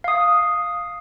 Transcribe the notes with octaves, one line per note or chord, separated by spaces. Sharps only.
F5 D#6